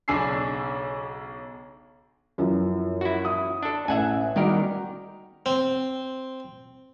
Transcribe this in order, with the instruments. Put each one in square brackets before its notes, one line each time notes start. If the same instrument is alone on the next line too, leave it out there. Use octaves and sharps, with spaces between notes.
[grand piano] B1 C#3 D4 G#5 E6 C7
[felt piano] F#2 E3 F3
[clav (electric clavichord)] E4 F#4
[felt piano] D#6
[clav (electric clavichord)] D4 A4
[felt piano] A1 [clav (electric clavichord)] E5 F#5 G#5
[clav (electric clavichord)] D#3 G4 A#4 [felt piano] G3 F#4
[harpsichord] C4